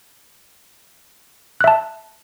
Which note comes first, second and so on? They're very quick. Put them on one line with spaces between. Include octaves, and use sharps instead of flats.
F#6 E5 A5